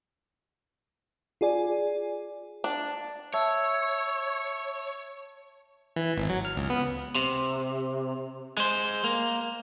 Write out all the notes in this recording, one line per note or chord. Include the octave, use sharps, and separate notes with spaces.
F4 G#4 D5 G#5
D4
C#5 E5 A5 E6
E3
G#1
F#3
F6
C#2
B3
C3
G#3 C5
A#3